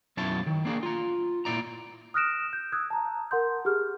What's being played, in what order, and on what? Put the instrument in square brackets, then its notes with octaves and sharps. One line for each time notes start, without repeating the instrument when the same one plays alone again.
[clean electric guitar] B1 F#2 E4 C#5 A5
D#3
A#3 D4 G#4
F4 A#5
A#2 E4 D5 A#5
[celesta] D#6 F6 F#6 A#6 D7 E7
G6
D#6 E6 F#6 G#6
A5 A#5
A#4 F#5 C6 G6
G4 G#4 F6